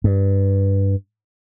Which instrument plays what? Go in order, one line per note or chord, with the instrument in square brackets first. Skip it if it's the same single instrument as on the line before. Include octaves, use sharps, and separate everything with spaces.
[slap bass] G2